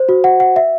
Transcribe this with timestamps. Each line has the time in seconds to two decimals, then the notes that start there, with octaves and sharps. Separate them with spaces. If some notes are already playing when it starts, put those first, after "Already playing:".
Already playing: C5
0.09 F#4
0.24 F#5
0.40 F#5
0.56 E5